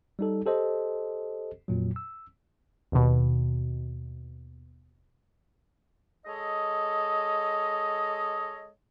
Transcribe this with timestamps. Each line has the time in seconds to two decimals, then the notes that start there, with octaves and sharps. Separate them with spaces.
0.19 G3 D#4 A4
0.46 G4 A4 C5 D#5
1.68 F2 A#2 F#3
1.96 E6
2.92 D#2 B2
6.26 G#3 A4 C#5 D#5